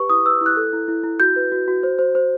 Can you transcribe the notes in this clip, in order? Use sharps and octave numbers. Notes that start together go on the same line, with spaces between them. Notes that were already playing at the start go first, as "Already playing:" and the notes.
Already playing: G4 B4 C#6
E4 D#6
B4 E6
E4 F#6
A4
E4
E4
E4
F#4 G6
B4
F#4
F#4
C5
C5
C5